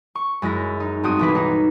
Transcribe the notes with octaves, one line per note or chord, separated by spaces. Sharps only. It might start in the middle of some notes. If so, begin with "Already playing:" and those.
C#6
F#2 G#3 E4 A#6
D#4
G2 C4 F#4 D#6
B1 E3 B4
D#4